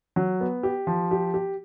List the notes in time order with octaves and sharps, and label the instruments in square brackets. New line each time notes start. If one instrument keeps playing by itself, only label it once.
[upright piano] F#3
B3
G4
F3
G4
G4